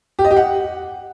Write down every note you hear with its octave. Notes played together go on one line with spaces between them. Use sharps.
G4
D#5
G4
F#5